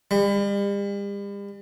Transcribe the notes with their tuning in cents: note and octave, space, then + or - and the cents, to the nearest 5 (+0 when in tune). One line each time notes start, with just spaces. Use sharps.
G3 +40